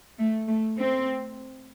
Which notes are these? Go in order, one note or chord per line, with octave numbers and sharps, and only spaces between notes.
A3
A3
C4